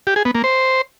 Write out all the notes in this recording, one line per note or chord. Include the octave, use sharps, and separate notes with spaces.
G4
G#4
B3
A#3
C5